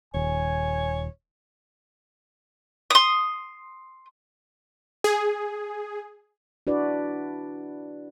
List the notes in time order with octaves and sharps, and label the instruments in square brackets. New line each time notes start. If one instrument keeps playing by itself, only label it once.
[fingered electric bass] D#1 D#2 [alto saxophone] C#5 [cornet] G#5
[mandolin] C6 D#6
[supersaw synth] G#4
[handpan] D4 E4 F#4 B4 D5